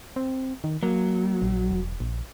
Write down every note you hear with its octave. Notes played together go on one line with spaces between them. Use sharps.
C4
D#3
F#3 A#3
A#1
E1
A#1